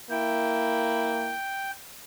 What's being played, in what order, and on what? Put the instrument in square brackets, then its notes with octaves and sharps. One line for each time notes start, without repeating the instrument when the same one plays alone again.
[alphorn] A#3 [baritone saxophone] E4 [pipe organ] G5